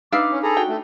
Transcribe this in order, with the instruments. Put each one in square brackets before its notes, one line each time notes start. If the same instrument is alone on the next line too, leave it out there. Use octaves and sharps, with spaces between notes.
[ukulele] D4 D#4 B4 [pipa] D5 E5 F5 [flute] D6
[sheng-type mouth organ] C#4
[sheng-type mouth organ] G#4 A4 A#5 [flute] B5
[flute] F#4 [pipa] G5
[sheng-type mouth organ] A3